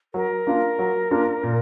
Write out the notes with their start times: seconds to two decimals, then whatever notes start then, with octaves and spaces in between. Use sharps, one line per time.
0.14 F#3 A#4
0.47 A#3 D4 F4
0.79 F#3
1.11 A#3 D4 F4
1.43 A#2